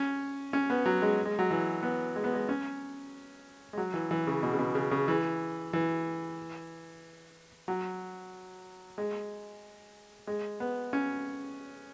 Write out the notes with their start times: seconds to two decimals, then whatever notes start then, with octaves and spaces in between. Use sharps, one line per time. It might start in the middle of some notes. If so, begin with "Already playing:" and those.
Already playing: C#4
0.53 C#4
0.70 B3
0.86 F#3
1.02 G#3
1.25 G#3
1.39 F#3
1.51 E3
1.83 B3
2.16 G#3
2.24 B3
2.34 G#3
2.49 C#4
3.73 G#3
3.77 F#3
3.94 E3
4.11 E3
4.27 C#3
4.43 B2
4.53 C#3
4.59 B2
4.75 C#3
4.91 C#3
5.08 E3
5.73 E3
7.68 F#3
8.98 G#3
10.27 G#3
10.60 B3
10.93 C#4